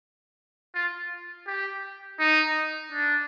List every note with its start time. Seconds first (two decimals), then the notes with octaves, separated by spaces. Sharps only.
0.75 F4
1.48 G4
2.20 D#4
2.92 D4